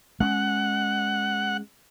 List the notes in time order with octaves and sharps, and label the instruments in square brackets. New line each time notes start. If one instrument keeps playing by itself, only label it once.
[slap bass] G#3 C#4 [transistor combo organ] F#5